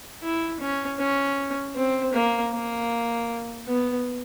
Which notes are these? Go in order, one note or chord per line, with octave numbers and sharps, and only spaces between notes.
E4
C#4
C#4
C4
A#3
A#3
B3